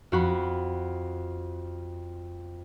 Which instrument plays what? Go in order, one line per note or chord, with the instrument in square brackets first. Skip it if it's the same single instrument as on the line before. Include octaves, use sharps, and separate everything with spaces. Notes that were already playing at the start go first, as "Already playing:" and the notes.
[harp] F2 F#4 B5